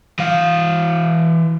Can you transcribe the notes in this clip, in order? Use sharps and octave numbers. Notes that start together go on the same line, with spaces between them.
E3 F5